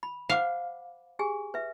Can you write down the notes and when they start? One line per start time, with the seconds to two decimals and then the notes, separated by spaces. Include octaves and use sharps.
0.03 B5
0.29 C5 F5 F#5 D6
1.19 G4 G#4 G#5
1.54 B4 E5